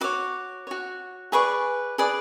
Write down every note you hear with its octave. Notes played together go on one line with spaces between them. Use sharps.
F#4 C#5 D6
F#4 C#5
G#4 B4 D5 C#6
G#4 B4 D5